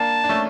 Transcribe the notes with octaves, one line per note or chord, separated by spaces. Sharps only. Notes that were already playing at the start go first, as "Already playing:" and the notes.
Already playing: A#3 D4 A5
D4
A3 C#4